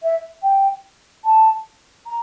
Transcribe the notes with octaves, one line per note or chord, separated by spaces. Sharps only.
E5
G5
A5
A#5